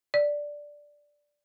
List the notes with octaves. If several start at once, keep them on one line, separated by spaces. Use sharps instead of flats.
D5